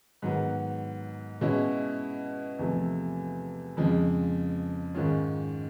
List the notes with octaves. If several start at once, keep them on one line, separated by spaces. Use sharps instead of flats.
G#2 D#3 F#3 B3
B2 G#3 C#4 E4
E2 C3 F3 A3
F2 C#3 F3 G#3
G#2 D#3 G#3 C#4 F4